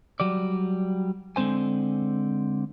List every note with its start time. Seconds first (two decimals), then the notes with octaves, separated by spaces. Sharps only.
0.20 F#3 G3 D5
1.36 D3 G#3 C4 C5 G#5